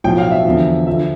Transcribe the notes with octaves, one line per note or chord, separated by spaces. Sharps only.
B1 A2 F3 G5
F5
E5
E2 D3 F3
D3 F3 E5